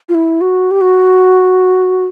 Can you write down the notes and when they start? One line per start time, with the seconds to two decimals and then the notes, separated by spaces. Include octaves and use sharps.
0.09 F4
0.14 E4
0.41 F#4
0.71 G4
0.81 F#4